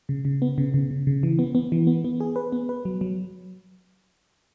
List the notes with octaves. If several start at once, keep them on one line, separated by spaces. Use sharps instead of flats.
C#3
C#3
B3
C#3
C#3
C#3
C#3
E3
B3
B3
E3
B3
B3
G#4
B4
B3
B4
F#3
F#3